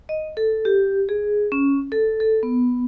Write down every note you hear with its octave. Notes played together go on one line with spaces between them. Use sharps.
D#5
A4
G4
G#4
C#4
A4
A4
B3